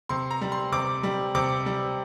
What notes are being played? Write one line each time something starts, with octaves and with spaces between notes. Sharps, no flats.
C3 C6
A#5
G3
C6
C3 D6
G3
C3 D6
G3